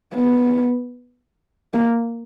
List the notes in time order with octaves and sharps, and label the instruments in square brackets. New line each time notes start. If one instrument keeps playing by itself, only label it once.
[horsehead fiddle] B3
A#3